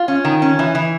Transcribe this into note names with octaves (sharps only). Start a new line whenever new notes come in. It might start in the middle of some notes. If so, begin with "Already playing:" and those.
Already playing: F4
C#4
D#3
C#4
E3
E3